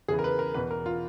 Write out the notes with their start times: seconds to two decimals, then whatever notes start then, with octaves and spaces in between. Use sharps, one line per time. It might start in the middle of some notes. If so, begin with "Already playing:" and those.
0.08 E2 C#3 E3 G#4
0.19 A#4
0.24 B4
0.39 A#4
0.54 E2 B2 B4
0.71 A#4
0.86 F4